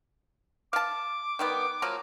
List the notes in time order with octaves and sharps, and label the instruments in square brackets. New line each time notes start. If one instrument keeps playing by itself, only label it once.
[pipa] F5 A5 [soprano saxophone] D6
[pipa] D#3 G3 B3
F3 F#3 A#3